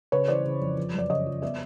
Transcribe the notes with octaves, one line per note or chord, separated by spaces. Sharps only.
C#3 B4 C#5
E3 C5 D5
C#3
F2
F3
F#2 D5
C#3 C#5 D#5
F3
B3 D5 E5